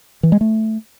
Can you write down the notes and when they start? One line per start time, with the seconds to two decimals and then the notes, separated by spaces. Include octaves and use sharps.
0.23 E3
0.32 G#3
0.41 A3